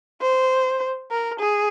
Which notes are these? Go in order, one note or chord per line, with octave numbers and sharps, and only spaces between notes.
C5
A#4
G#4